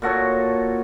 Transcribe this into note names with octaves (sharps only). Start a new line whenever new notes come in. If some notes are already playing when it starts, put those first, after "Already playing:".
A#2 F#4 A4 C#5